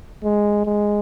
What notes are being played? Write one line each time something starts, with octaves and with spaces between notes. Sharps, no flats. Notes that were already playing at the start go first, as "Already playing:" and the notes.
G#3
G#3